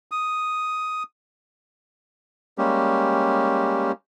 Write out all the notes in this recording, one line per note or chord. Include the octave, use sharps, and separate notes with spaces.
D#6
G3 G#3 A#3 C#4 G4